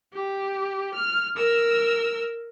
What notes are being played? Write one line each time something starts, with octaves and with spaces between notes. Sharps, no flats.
G4
F6
A#4 E6